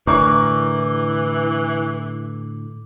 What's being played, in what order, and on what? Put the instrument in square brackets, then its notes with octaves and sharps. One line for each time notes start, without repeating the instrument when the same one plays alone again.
[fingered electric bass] A2 D3 [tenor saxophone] E3 [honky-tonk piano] A#4 D5 C#6 [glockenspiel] D6 G6